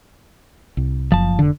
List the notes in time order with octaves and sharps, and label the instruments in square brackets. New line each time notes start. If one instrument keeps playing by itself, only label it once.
[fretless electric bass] C2
[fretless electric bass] F#1 [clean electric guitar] F3 A5
[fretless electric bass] F1 D3